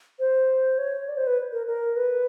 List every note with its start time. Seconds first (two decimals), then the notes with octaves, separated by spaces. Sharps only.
0.19 C5
0.78 C#5
1.08 D5
1.17 C5
1.27 B4
1.52 A#4
1.67 A#4
1.96 B4